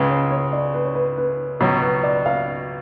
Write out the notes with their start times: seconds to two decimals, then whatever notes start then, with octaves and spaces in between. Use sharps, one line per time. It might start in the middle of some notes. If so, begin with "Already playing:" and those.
Already playing: C#2 C#3 G#3 B4
0.09 C#5
0.31 C#5
0.53 D5
0.74 B4
0.84 C#5
0.95 B4
1.17 B4
1.60 C#2 B2 F#3 C#5
1.82 B4
2.03 D5
2.26 F5